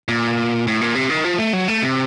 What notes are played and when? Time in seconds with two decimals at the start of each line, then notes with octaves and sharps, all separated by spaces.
0.08 A#2
0.67 A2
0.81 A#2
0.95 C3
1.10 D#3
1.24 F3
1.39 A3
1.53 F#3
1.68 A3
1.82 C3